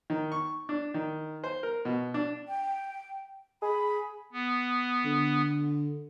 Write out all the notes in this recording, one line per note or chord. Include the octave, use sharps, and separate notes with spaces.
D#3
C#6
D4
D#3
C5
A#4
B2
D4
G5
G#4 B5
B3
D3